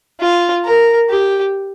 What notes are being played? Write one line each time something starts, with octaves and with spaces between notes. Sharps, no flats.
F4
A#4
G4